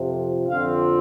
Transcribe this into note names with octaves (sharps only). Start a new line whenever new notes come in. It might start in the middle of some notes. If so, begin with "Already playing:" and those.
Already playing: F2 C3 F3
F2 D3 F3 C4 F5